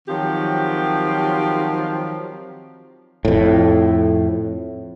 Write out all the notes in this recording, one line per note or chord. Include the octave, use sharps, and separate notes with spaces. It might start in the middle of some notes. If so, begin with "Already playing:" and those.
D#3 F3 F#3 C4 G4
F2 A2